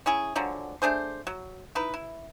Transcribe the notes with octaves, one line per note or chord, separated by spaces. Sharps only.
C#4 E4 G#4
D3 F3 F#3 G#3
A3 D4 G#4 C5
F#3
D#4 E4 B4
E4